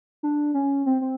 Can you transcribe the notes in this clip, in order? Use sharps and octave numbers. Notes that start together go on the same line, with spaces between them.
D4
C#4
C4
C4